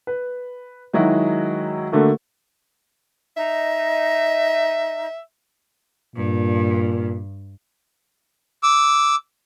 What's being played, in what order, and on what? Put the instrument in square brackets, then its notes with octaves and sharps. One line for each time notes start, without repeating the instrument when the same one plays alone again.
[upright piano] B4
D#3 F#3 G#3 E4 F#4
D3 A3 A#3 F#4
[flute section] D#4 D#5 [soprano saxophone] E5
[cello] G2 [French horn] A#2
[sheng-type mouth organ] D6 E6